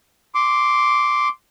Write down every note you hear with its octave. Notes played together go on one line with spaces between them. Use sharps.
C6 D6